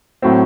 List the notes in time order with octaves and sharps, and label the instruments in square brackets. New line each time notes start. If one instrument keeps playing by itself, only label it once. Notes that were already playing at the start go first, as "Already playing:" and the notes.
[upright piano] A2 F#3 C4